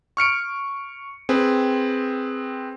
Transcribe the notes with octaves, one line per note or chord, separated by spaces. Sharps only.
C#6 F6 C#7 D7
C4 G#4 B4